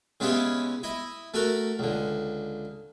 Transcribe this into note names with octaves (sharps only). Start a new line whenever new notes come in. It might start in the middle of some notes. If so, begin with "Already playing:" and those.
C#3 G#3 B3 C#4 E4 G4
E4 D#5
A3 F#4 A4 A#4
C#2 D3